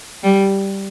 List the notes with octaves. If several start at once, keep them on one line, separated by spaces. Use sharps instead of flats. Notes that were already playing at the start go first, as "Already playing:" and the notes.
G3